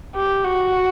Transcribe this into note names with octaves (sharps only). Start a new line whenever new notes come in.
G4
F#4